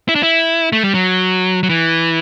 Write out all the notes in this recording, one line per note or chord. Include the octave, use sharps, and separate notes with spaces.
E4
D4
E4
A3
G3
F#3
F#3
E3